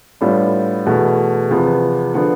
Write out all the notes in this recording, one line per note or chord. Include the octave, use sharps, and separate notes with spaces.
A2 G3 B3 D4 F4
E2 B2 A3 E4
E2 C3 F3 B3
D3 F3 B3